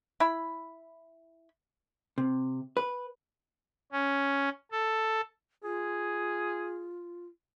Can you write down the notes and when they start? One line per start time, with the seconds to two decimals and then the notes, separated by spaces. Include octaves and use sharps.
0.20 E4 B5
2.18 C3
2.77 B4
3.92 C#4
4.72 A4
5.64 F4 G#4